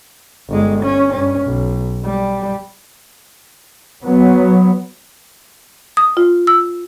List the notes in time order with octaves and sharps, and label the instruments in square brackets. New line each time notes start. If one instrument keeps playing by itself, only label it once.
[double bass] G1 G#3
C#4
G2 C#4
B1
G3
[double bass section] F#3 B3
[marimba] D#6
F4
E6